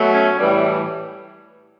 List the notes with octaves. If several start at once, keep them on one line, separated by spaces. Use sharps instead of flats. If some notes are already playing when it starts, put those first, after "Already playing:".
Already playing: B2 F#3 A3
C#4
A2 E3 G3